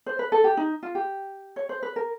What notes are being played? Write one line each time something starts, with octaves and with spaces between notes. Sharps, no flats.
C5
B4
A4
G4
D#4
F4
G4
C#5
C5
B4
A#4